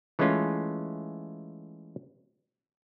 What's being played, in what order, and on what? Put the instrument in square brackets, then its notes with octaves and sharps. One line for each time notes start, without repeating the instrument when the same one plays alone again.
[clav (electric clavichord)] E3 G#3 A3 C#4 F4